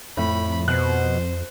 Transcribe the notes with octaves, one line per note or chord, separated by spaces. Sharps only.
F2 A2 B5
B2 C5 F#6